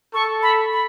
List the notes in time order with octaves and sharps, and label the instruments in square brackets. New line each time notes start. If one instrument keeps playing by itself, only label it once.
[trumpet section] A4 [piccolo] C#6
[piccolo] B5
B5